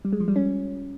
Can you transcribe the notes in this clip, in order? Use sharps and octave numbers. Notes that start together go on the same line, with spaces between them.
G3
G#3
F3
G3
C#4